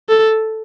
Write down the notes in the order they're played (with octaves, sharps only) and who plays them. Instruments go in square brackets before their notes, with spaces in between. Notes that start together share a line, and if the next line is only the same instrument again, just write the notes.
[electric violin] A4